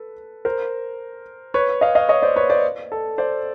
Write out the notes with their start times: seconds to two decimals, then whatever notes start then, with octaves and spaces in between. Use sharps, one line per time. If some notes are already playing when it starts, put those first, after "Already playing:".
Already playing: A4 B4
0.45 A#4 C5
1.54 B4 C#5
1.81 D#5 F5
1.95 D#5 F5
2.09 C#5 D#5
2.22 C5 D5
2.36 B4 C#5
2.50 C5 D5
2.92 A4
3.18 C5 D5